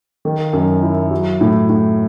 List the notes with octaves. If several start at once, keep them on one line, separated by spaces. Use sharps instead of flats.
D#3
F#2
E4
F#3
A2
A2